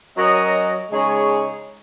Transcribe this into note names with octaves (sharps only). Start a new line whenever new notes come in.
F#3 C#4 F#4 A#4 D#5
C#3 G#3 D#4 G#4 C#5